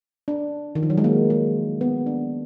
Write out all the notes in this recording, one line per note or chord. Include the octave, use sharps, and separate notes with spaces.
D4
D#3
F3
F#3
G#3
A#3
G#3
B3
D4